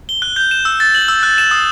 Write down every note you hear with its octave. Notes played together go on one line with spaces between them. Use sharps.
G7
F#6
G6
E7
E6
A6
F#7
E6
F#6
E7
D#6